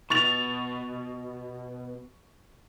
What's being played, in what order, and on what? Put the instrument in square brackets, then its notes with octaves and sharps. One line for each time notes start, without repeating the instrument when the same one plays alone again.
[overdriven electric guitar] B2 [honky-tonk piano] C#6 A6 F7